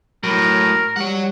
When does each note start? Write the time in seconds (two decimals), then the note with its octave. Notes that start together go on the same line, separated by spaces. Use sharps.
0.23 A2 F#3 A#4
0.96 G3 C#5 F#5